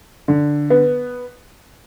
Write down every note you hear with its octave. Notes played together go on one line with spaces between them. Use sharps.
D3
B3